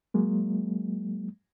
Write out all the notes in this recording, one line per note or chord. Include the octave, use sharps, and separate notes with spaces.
F#3 G#3 A#3